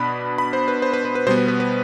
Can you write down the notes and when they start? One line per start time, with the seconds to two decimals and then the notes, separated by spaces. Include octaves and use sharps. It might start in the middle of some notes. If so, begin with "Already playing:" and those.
Already playing: B2 B3 D4 B5
0.38 B5
0.53 C5
0.68 B4
0.82 C5
0.93 B4
1.05 B4
1.15 B4
1.27 B2 G3 B3 C5
1.37 B4
1.48 B4
1.60 B4